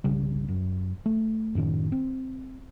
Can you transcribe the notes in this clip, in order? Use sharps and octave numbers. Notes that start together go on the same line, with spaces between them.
G1 C2 C#3 G3
F#2
A3
F#2 A2 D#3 C#4
C4